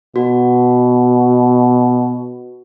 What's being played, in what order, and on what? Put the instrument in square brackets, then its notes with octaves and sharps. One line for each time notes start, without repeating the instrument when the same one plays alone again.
[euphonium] B2 [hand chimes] F#4